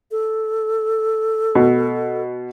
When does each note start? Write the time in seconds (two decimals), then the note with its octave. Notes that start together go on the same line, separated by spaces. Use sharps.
0.11 A4
1.55 B2